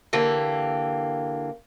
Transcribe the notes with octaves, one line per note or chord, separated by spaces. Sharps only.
D3 E3 A#3 G4